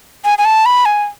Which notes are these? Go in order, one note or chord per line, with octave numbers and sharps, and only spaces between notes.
G#5
G#5
A5
B5
G#5